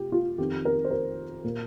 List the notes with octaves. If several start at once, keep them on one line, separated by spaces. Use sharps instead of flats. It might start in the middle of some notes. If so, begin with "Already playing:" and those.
Already playing: C3 F4 G4
F4
F2 D#3 C4 G4
A#4
C5
A#4
A#2 A#3